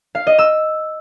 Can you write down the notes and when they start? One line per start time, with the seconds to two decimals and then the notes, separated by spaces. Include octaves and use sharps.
0.15 F5
0.27 D#5
0.39 E6